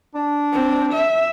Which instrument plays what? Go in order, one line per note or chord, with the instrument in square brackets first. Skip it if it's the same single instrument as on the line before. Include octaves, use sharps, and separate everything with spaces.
[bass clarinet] D4
[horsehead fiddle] C4
E5